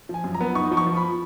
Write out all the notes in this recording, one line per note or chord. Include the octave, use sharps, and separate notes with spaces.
F3 G#5
F#2
A#5
B3
D#4 C#6
F3
C#6
F3
B5